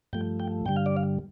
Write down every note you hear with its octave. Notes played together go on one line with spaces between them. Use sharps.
G2 F3 A3 G5
G5
G2 D3 G3 G5
F5
D5
F5